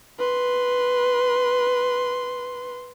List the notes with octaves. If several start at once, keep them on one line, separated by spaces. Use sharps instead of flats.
B4 C6